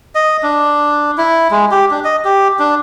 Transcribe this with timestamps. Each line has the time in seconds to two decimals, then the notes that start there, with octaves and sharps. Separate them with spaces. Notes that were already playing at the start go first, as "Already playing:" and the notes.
0.15 D#5
0.43 D4
1.18 E4
1.51 G#3
1.71 G4
1.91 D4
2.04 D#5
2.25 G4
2.59 D4